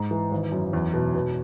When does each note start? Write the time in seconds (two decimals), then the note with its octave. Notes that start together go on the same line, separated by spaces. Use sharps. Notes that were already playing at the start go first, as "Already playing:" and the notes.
Already playing: G#2
0.11 E3
0.31 G#1
0.52 F#2
0.73 E2
0.94 B2
1.14 B2